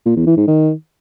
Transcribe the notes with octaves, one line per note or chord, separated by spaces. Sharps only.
A#2
E2
E3
G#2
D#3